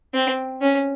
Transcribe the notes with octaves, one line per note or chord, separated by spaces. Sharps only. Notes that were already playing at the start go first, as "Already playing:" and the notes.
C4
C#4